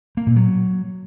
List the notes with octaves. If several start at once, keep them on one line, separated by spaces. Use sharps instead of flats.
A#3
A#2
F#3